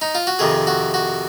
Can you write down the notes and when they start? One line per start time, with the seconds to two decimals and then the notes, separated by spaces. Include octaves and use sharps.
0.01 D#4
0.15 F4
0.27 F#4
0.39 F2 C3 D#3 G#4
0.67 F#4
0.94 F#4